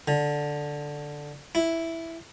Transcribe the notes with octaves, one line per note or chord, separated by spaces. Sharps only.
D3
E4